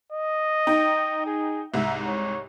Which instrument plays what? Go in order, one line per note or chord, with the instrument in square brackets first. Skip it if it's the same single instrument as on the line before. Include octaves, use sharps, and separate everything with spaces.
[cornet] D#5
[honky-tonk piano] D#4 G5
[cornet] G#4
[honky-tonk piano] C2 G#2 [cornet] E5
[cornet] C#5